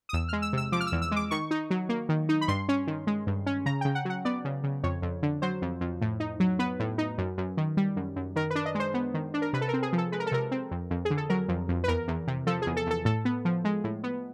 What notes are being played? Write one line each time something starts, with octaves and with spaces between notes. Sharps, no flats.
D#6
E2 E6
G#3 F6
E6
C3 E6
F3 D6
F6
E6
E2
E6
G#3 D6
D#3 C#6
D#4
F#3
A#3
D#3
D#4
B5
G2 C6
C#4
D#3
G#3
G2
C#4
C#3 A#5
C#3 G5
F#5
F#3 F#5
B3 D5
C#3
C#3
F2 C#5
F2
D3
F#3 C5
F2
F2
A2
D#4
F#3
B3 B4
A2
D#4
F#2
F#2
D#3
G3
F#2
F#2
D#3 A#4
B4
D4
D#5
G#3 C5
B3
D#3
D4
A#4
C3 B4
A4
A#4
C4
G#4
F3
A4
G#3 B4
A#4
A4
C3 A#4
C4
F2
F2
G#4
D3
A4
F#3 A#4
F2
F2
B4
E2 A#4
E2
C3
F3 A4
E2 G#4
A4
E2 A4
A2 A4
B3
F3
G#3
A2
B3